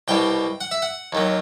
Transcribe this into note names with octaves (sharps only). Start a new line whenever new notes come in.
C2 B2 G3 G5
F#5
E5
F#5
D#2 D#3 F#3